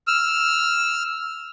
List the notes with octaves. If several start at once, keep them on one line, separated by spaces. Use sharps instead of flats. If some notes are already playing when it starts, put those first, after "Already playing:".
E6 F6